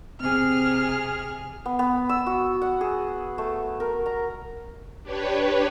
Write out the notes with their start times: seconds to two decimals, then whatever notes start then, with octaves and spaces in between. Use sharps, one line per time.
0.21 C3 C4 G#4 F6
1.65 B3
1.79 B3
2.09 E6
2.26 F#4
2.62 F#5
2.81 G#4
3.38 A3
3.80 A#4
4.06 A#5
5.03 D4 G4 B4 C#5